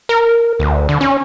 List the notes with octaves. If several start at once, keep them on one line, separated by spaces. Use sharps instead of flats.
A#4
D2
D3
C#4